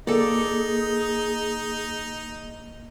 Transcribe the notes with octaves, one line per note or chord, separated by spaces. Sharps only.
A#3 D#4 G#4 A4 D5